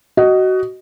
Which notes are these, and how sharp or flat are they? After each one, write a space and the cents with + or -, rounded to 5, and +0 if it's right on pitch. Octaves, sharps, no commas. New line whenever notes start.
F#4 +20 D#5 +0